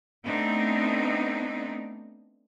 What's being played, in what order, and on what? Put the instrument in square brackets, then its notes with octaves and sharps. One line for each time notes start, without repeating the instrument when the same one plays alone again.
[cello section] A3 B3 C4 D4 D#4